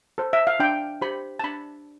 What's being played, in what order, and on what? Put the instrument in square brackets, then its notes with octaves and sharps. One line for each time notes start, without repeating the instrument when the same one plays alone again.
[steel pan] A4 C5
E5
F5
D4 G5
G4 C5 B5
A5
D4 B5